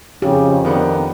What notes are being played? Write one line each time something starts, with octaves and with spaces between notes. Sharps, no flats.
F2 C#3 G4
D#3 B3 D4 A#4